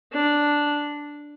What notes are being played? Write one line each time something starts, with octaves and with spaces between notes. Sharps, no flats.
D4